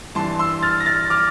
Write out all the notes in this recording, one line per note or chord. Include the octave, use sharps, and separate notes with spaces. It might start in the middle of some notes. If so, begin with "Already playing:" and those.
G2 E3 A5 C6
C6 E6
F6 A6
A#6
F6 A6
D6 F6